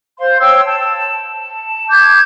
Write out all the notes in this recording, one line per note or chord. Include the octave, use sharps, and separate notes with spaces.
C5 F5 C6
C#5 G5 C6 E6
A5
A5
D6 G6 G#6